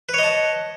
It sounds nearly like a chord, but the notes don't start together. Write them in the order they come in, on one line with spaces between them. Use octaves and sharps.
B4 C#5 D#5 A5